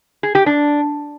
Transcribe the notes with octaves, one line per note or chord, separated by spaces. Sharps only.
G#4
G4
D4